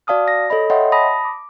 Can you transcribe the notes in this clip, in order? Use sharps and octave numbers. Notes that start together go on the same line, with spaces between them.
F#4 D5 F5 A5 D#6 F6
A#6
A4 C#5 D#5 B5
C#5 D#5 E5 F#5 G5 C6
A5 B5 D#6 A#6
D6